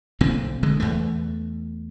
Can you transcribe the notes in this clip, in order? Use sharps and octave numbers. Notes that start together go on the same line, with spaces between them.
B1 A#2 D3 C4
D3 G#3
E2 E3 A3